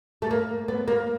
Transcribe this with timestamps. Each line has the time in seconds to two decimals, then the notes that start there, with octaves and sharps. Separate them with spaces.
0.22 A3
0.31 A#3
0.68 B3
0.88 A#3